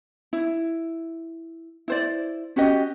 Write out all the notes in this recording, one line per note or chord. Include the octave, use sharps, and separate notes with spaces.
E4
E4 C5 D5
C#4 F#4 G4 D#5